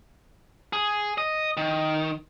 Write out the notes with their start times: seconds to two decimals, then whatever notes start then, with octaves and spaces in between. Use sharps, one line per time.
0.73 G#4
1.18 D#5
1.57 D#3